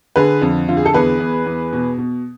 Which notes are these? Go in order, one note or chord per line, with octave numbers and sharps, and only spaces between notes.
D3 G#4 B4
F2
D3 F4
G#4
A4
E2 G#4 B4
E2
E2
B2
B2